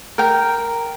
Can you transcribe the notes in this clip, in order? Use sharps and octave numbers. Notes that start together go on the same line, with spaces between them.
A#4 G5